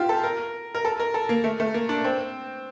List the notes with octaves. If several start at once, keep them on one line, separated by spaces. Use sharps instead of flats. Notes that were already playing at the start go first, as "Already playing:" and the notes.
Already playing: E4 F4 G4
A4
A#4
A#4
A4
A#4
A4
A#3
A3
A3
A#3
D4
C4